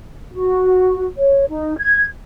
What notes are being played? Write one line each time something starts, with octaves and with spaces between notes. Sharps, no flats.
F#4
C#5
D#4
G#6